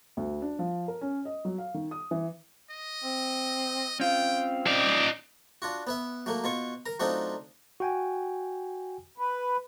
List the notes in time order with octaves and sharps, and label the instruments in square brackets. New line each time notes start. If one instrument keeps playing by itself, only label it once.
[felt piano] D2
D4
F3
A#4
C#4
D#5
F#3
F5
D#3
D#6
E3
[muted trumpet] D#5
[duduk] C4
[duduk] C4 [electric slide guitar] C#4 F4 [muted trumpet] G5
[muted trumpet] A#3 [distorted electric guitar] D#4 D5
[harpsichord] D4 F4 F#4
B3 B4 E5
F#3 A3 A#3
B2 F4 C#6
A#4 A#5
F#3 A3 C4 D4 D#4 F4
[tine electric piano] F#4 G5 G#5
[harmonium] B4